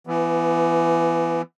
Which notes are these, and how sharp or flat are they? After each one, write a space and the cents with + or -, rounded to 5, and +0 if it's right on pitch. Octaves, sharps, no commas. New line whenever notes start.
E3 +25 B3 +0